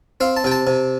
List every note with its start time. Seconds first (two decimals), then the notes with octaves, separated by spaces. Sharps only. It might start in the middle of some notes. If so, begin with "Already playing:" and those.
0.21 C4 F5
0.37 A5
0.44 C3 G5
0.51 A5
0.67 C3